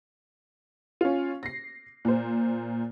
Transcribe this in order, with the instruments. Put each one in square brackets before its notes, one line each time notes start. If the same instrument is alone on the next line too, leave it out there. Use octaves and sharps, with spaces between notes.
[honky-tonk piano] C#4 F4
A#6 C7
A#2 C5